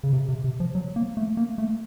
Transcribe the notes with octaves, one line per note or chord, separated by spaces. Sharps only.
C#3
C3
C3
C3
F3
F#3
A#3
A3
A#3
A3